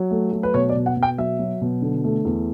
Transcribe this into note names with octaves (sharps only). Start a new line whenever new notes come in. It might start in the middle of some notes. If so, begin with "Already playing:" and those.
Already playing: F#3
A3
F#3
B4
B2 C#5
D5
B2
F#5
B2
G5
F#3 E5
F#3
B2
D3
A3
E2